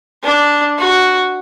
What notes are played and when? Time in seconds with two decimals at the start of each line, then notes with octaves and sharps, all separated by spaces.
0.24 D4
0.78 F#4